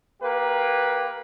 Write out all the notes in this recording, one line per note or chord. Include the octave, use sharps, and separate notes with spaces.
A#3 G4 B4